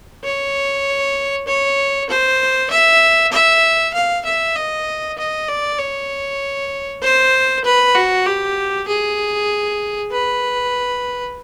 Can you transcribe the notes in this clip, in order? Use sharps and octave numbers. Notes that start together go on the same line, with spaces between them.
C#5
C#5
C5
E5
E5
F5
E5
D#5
D#5
D5
C#5
C5
B4
F#4
G4
G#4
B4